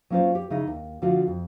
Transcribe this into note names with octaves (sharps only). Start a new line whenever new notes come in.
F#3 A#3 C#4 F4 C5 D5
G4 C#5
C#3 D#4 E4 D#5
D#2
D3 F3 A3 F4 F#4
F2